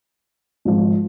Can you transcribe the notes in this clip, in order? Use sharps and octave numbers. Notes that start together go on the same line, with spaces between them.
G#1 G#2 F3